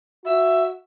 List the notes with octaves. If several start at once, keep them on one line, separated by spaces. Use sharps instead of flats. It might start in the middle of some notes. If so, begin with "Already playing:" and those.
F#4 E5